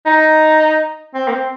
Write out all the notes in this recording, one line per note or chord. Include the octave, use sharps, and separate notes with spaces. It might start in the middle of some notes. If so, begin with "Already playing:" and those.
D#4
C4
A#3
C4